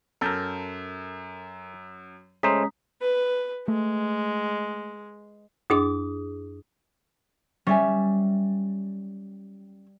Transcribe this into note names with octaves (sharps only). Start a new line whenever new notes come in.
F#2 A4 A#4 G6
G#3 A3 C#4 C5 A#5 D#6 B6
B4
G#3 A3
F#2 D4 G#4 D6 D#6
G3 C#4 E5 G#5